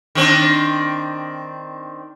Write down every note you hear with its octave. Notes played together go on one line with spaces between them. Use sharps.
D#3 C4 D4